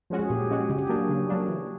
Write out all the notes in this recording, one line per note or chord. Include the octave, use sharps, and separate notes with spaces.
F3 G#3 C#4 F#4
G#4
A#2 G4
F3 G#3 C#4 F#4
C#3 G#4
G4
F#3 A#3 D4 F#4
G4
C#3
F#3 A#3 D4
E3